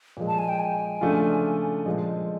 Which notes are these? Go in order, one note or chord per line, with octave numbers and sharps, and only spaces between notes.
A#2 F3 G#3
A5
G#5
G5
G#5
C#3 F3 A3 D4 F4
A#2 F3 G#3